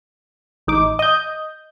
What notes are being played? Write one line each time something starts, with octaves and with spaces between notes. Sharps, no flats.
A1 D#4 D6
D#5 G6